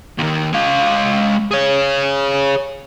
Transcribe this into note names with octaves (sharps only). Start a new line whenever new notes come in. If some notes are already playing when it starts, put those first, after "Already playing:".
D#2 D#3
G#3 F5
G#4 C#5